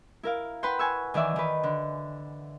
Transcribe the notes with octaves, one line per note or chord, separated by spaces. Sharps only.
E4 A#4 F5
B4 F#5 G5 C6
G#5 C#6 E6
D#3 E3 D5 E5
D#3 B4
D3